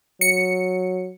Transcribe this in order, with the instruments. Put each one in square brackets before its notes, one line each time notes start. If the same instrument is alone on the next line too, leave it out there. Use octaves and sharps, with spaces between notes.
[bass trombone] F#3 [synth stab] C#7